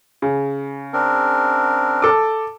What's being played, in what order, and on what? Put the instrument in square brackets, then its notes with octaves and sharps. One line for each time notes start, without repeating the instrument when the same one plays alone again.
[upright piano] C#3
[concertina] C4 D4 A#4
[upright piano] A4 D6